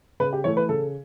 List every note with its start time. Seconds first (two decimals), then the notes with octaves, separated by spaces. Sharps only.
0.20 C#3 B4
0.33 G4
0.44 E3 A3 C#5
0.57 B4
0.69 C#3 A4